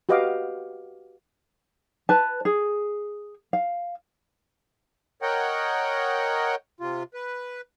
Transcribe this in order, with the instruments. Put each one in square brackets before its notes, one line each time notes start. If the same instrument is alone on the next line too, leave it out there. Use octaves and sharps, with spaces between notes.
[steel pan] F#4 G4 B4 D#5 F5 D6
[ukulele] B4 A5
G#4
F5
[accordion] A#4 C#5 D#5 F#5 G5
C3 F4
B4